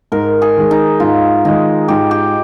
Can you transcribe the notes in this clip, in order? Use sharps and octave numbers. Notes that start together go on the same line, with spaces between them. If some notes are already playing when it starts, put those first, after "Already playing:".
G#2 A#4
G#4
D#3 G#3
D#4
G#2 F4
D#3 G#3 D#4
G#2 G4
G4